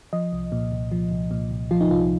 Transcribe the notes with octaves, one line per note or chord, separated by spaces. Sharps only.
F3 D#5
C2
A#2
C2
F3
C2
A#2
C2
F3 F4
D#4
C2 F4